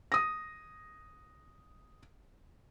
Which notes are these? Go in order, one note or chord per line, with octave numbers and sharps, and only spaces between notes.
D#6 A#6